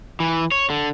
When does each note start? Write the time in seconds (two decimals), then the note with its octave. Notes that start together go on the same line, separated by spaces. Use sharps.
0.20 E3
0.52 C#5
0.70 D3